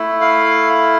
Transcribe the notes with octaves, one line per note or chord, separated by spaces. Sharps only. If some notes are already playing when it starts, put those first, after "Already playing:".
Already playing: A3 E4
F5